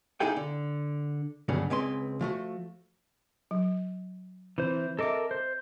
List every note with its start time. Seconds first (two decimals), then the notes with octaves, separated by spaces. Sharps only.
0.20 A#3 D#4 E4 G#4 A4 G5
0.37 D3
1.49 D2 G2 C#3 F#3 A3 B3
1.70 C#2 G#3 C4 B4 C6
2.21 F3 A3 F#4
3.51 F#3
4.58 E3 C4 C5
4.99 A4 A#4 D#5 E5 D6
5.31 C5